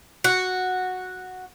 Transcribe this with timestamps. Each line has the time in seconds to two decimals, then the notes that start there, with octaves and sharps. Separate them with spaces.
0.24 F#4